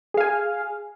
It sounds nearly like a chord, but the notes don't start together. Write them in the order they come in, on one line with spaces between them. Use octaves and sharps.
G#4 F5 G#5